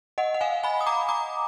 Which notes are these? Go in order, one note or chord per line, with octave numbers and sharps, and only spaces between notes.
D#5 F#5
F#5
F5 G#5
G#5 B5
D#6
A#5 D6
A#5 D6